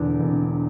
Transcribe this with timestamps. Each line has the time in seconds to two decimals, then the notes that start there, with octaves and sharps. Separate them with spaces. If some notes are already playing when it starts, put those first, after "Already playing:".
Already playing: E1 E2 D3
0.20 E1